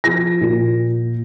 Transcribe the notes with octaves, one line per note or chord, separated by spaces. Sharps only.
F3 A#6
A#2